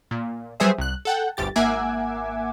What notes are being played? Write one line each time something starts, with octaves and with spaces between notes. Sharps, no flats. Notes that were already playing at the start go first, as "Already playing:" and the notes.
A#2
F#3 G3 B3 G#4 C5 E5
C2 F#6
A4 F#5 G5
G1 D2 G4 A6
G#1 A#3 E5 F#5 G#5 D6